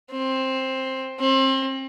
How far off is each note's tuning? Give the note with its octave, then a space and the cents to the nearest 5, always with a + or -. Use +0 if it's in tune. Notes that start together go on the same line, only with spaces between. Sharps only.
C4 +10
C4 +30